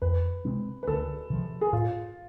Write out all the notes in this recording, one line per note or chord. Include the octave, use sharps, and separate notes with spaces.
F2 B4
C3 G#3 C4
B4
D2 A4
C3 F3
G#4
A2 F4